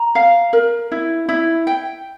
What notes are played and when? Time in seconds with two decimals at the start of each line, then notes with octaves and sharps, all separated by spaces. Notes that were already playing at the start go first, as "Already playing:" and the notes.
Already playing: A#5
0.15 F5
0.53 A#4
0.92 E4
1.29 E4
1.67 G5